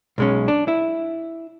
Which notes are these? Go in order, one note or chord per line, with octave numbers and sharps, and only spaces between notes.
B1 G#3 C#4
D4
E4